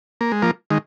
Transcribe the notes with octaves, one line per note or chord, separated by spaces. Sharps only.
A#3
G#3
F3 A#3
D#3 G#3